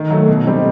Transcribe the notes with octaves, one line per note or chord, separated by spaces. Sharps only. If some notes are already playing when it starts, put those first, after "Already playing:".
Already playing: D#3
F#3 A3
B2
G3 C4 D#4